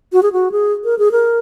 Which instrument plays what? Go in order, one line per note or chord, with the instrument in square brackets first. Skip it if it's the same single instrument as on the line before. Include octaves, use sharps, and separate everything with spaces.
[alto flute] F#4
G#4
F#4
G#4
A#4
G#4
A#4